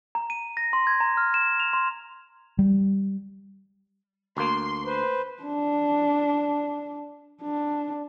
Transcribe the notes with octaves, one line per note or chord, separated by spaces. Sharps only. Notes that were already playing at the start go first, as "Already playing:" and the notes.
A#5
D#7
A#6
C6
G#6
A#5
F6
E7
F7
C6
G3
D2 A#3 C6
B4 C5
D4
D4